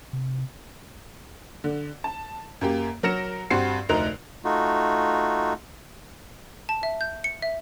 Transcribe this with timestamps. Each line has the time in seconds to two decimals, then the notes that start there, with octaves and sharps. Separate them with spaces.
0.13 C3
1.64 D3
2.04 A5
2.61 F#2 A#3 G4
3.03 F#3 A#4 F6 A#6 C#7 E7
3.50 G2 C4 F#4 G4 C5 C7
3.89 F1 D2 D#4 A#4 F#6 F7
4.45 A3 D#4 F4 F#4
6.69 A5
6.83 E5
7.01 G6
7.24 C#7
7.42 E5